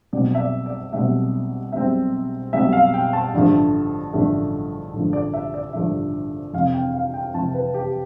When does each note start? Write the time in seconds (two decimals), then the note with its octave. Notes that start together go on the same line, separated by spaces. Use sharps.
0.13 B1 B2 G3 C4 D5
0.35 E5
0.40 D5
0.66 D5
0.93 B1 B2 G3 C4 E5
1.72 B1 B2 G3 C4 E5
2.53 B1 B2 G3 C4 E5
2.73 F5
2.94 G5
3.13 A5
3.34 A1 G2 D3 F3 A3
4.13 A1 G2 D3 F3 A3
4.93 A1 G2 D3 F3 A3
5.13 D5
5.34 E5
5.54 D5
5.73 A1 G2 D3 F3 A3 E5
6.53 F2 C3 E3 F5
6.74 G5
6.94 F5
7.14 G5
7.34 F2 C3 E3 A5
7.54 B4
7.74 G4